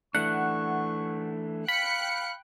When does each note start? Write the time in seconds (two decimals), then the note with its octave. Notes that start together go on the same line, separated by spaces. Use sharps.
0.15 E3 A3 D4 F#5 C#6
1.68 F5 G5 B5 F#6 C#7